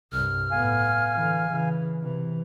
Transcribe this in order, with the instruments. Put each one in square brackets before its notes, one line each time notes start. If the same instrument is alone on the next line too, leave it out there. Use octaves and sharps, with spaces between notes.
[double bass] C2 G2 [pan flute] F6
[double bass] A2 B3 [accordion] F5 G#5
[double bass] D3 E3
C#3 E3
C3 E3